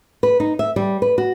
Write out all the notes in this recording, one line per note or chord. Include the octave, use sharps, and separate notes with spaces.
B4
D#4
E5
G3
B4
F#4